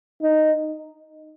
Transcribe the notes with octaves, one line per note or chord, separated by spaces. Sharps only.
D#4